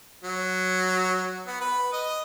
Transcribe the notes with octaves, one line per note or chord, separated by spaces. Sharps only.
F#3
B3
B4
D#5